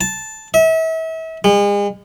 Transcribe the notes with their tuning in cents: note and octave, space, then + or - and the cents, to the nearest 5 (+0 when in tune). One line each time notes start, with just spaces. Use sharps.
A5 -5
E5 -35
G#3 -40